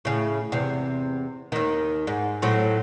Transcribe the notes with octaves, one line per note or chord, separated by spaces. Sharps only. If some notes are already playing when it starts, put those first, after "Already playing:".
A2 C#3
E2 C3
D#2 D#3
G#2
A2 F#3 C4